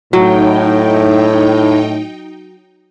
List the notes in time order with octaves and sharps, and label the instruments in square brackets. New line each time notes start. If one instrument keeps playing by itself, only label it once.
[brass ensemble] A2 [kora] F#3 [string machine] D#4 G5